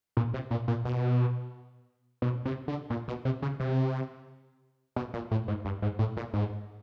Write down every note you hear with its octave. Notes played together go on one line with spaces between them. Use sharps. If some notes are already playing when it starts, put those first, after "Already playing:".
A#2
C3
A#2
A#2
B2
B2
C3
D3
A#2
B2
C3
C#3
C3
B2
A#2
A2
G#2
G2
G#2
A2
A#2
G#2